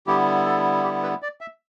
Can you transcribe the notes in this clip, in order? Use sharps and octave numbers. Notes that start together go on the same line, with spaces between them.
D3 G3 B3 E4 G4
A4
G4
B4
D5
E5